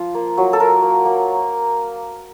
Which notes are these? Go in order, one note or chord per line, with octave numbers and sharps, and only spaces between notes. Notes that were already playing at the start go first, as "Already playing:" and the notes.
Already playing: F3 F4
A#3
F#3
A4
F4 A#4
A#3
A#3